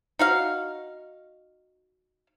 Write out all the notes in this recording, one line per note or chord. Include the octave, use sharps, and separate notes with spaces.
D#4 F#4 F5